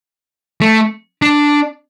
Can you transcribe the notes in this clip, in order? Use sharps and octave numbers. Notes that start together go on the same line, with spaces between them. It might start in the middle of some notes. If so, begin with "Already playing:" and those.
A3
D4